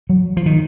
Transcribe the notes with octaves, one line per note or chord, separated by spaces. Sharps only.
F#3
F3
D#3